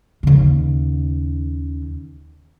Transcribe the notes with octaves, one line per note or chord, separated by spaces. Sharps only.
D#2 C#3